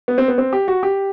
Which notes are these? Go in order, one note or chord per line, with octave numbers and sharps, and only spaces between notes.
B3
C4
B3
C4
G4
F#4
G4